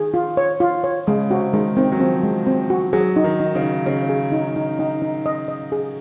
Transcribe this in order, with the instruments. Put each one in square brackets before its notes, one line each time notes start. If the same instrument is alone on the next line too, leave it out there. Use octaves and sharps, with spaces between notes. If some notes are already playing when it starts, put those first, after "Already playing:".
Already playing: [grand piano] D#3 [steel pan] G#4
[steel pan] F4
C#5
F4
C#5
[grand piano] C#3 [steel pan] G#3
[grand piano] C3 [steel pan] F#4
[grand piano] D#3 [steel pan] G#3
[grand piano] D#3 [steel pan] C4
[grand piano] F#3
[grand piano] F3 [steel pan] C4
[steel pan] G#3
C4
F#4
[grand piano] F#3 [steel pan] G#4
[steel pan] D#4
[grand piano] D#3
[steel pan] D#4
[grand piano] C#3
[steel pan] D#4
[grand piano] C#3 [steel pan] D#4
[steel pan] G#4
D#4
D#4
D#4
D#4
D#5
D#5
G#4